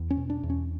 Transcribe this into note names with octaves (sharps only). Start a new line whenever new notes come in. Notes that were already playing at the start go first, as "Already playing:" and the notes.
Already playing: E2
C#4
B2
D4
E2
C#4